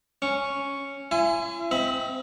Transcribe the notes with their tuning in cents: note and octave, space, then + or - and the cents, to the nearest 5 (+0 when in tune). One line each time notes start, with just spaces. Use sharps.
C#4 +0 C#6 +0
E4 +40 G#5 +0 C6 -40
C4 -10 D#5 +45 B5 +0